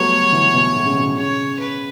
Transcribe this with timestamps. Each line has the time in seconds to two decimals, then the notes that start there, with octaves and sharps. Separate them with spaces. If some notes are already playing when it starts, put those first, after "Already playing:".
Already playing: F#3 G3 A3 B3 C#5
0.32 E3
0.54 B2
0.75 A2
0.86 C#3
0.96 B2
1.17 C#3 C#5
1.60 B4